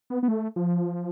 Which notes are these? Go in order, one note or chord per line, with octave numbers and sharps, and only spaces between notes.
B3
B3
A3
F3